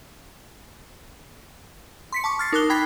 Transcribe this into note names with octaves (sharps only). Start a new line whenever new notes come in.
C6 B6 C#7
A5 C#6 D6
F6 A6 C7
D#4 A#4 D6 D#6 F#6 G7
G5 B5 G#6 B6 C7